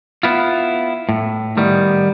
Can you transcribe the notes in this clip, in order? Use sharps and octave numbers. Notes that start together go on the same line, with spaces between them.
B3 E4 F4
A2
D#3 G3 B3